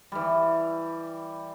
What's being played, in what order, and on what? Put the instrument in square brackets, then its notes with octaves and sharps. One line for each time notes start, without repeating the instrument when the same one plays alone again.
[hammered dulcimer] E3 G3